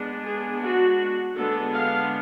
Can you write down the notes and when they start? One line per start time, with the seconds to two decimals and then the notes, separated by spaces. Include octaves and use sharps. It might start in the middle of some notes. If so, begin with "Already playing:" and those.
Already playing: G#3 B3 D4
0.25 G#4
0.62 F#4
1.36 D3 G#3 B3 D4 A4
1.73 F5